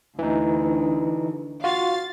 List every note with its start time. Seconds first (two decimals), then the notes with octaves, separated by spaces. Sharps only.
0.19 D2 E3 D#4
1.64 F4 F#4 F5 A6